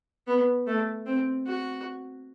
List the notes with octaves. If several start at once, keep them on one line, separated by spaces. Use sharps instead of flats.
B3
A3
C4
F#4